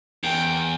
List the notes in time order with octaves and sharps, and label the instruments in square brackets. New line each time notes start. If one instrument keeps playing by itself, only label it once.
[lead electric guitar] E2 [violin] G5